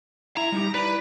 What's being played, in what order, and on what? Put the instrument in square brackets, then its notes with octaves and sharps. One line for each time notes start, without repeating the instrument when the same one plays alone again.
[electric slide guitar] E4 E5 [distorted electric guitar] A#5
[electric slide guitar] G3 D#4 G4
[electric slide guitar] E4 D5 [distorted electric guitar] B4